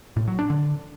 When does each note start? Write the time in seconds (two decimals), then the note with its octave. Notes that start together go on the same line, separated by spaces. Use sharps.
0.16 A2
0.28 F#3
0.39 D4
0.50 D3